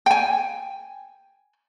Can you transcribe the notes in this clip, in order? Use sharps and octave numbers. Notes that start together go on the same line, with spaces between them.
G5 G#5